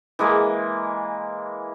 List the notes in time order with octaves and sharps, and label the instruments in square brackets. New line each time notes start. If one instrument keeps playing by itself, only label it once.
[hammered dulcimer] E3 G#3 A#3